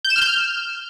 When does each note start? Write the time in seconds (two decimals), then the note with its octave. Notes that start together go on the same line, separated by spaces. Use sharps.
0.05 G6
0.10 E7
0.16 F6
0.22 G6
0.27 F6